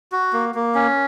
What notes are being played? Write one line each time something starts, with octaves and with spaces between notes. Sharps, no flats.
F#4
A#3
A#3
C#4